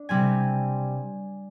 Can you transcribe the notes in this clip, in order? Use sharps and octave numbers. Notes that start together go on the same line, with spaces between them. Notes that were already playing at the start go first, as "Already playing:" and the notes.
Already playing: D4
C3 G3 C4 G#5